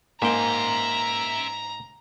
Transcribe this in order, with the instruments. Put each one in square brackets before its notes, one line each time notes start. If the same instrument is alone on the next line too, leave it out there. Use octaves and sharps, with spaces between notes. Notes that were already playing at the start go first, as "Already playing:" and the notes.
[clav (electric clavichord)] G#2 G5 [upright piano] A#3 [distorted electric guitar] E5 C6 [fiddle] A#5